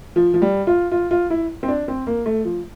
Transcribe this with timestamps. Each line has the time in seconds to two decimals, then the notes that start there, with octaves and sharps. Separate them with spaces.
0.16 F3
0.34 F3
0.42 G3
0.67 F4
0.92 F4
1.11 F4
1.30 E4
1.63 C4
1.68 D4
1.88 C4
2.07 A#3
2.26 A3
2.45 F3